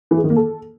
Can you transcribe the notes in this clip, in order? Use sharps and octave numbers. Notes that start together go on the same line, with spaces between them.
E3
G#4
D#3
A#3
A4